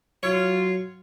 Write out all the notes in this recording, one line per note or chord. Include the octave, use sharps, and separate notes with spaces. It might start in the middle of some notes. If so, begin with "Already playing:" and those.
F#3 F4 C#5